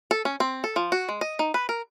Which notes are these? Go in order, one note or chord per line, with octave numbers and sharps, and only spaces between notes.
A4
C#4
C4
A4
F3
F#4
G#3
D#5
D#4
B4
A#4